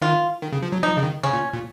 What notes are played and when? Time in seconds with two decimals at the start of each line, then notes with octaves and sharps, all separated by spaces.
0.01 D#3 F4
0.42 D#3
0.52 C#3
0.62 F3
0.72 F#3
0.83 F3 D#4
0.97 C#3
1.03 D#3
1.23 C#3 C#4
1.33 A#2
1.53 A#2